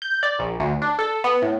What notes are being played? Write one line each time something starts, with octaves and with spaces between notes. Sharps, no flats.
G6
D5
A#1
D2
D4
A4
B3
A2